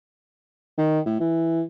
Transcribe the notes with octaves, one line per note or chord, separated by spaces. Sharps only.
D#3
A2
E3